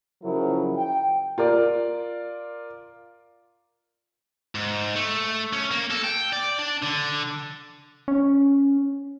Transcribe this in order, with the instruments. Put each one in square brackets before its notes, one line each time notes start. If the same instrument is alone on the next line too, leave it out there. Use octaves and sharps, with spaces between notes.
[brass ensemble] C#3 F3 F#3 E4 A#4
G5
[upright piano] F4 A#4 D5
[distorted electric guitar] G#2
A3
C#4
A#3
A4
G5
D5
D4
D3
[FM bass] C#4